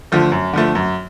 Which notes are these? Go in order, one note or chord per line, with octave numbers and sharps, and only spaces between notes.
D3 F3 A3
F#2
D3 F3 A3
F#2